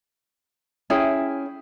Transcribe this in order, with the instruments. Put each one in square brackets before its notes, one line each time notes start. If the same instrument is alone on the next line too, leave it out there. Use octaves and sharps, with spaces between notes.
[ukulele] C#4 E4 G#4 G5